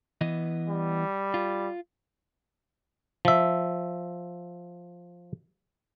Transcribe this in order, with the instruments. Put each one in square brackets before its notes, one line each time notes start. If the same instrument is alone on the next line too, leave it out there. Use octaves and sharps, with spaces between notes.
[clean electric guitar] E3 B3 D#5
[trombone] G3
[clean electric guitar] F4
[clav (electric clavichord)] F3 E5